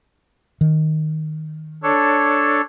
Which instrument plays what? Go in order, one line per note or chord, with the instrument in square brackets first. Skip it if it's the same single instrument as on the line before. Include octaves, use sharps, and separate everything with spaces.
[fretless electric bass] D#3
[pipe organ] D4 A4 C#5